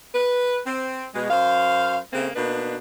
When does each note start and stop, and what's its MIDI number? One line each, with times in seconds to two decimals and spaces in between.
0.15 0.59 71
0.66 1.05 60
1.13 1.27 47
1.13 1.27 56
1.29 1.97 42
1.29 1.97 72
1.29 1.97 77
2.13 2.28 49
2.13 2.28 57
2.13 2.28 58
2.13 2.28 60
2.35 2.76 47
2.35 2.76 58
2.35 2.76 62
2.35 2.76 63
2.35 2.76 71